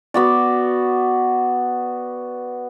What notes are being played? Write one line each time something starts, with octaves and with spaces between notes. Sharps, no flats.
B3 F#4 D5